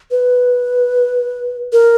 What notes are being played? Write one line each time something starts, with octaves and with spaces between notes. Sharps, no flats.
B4
A#4